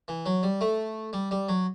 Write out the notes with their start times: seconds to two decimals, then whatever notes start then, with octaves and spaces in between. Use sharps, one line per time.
0.08 E3
0.26 F#3
0.43 G3
0.61 A3
1.13 G3
1.31 G3
1.49 F#3